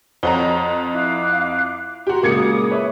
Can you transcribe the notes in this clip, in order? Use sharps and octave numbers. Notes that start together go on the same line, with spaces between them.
F2 C5 C#5 F#5 A#5 G7
E4 F5 D6 F#6
F#4 G4 A#5 C6
A#2 C#3 G#3 A#3 D6 D#6 G#6 C#7
B4 C#5 E5